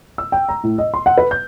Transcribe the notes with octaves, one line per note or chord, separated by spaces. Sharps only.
E6
G5
A#5
A2
D#5
C6
F#5
B4
G6